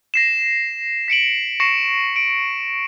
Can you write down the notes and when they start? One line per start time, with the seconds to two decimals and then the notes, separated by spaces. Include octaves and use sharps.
0.14 A#6 C7 E7
1.08 B6 C#7 D7 F#7
1.60 C#6 A#6 C7 C#7 E7
2.16 D7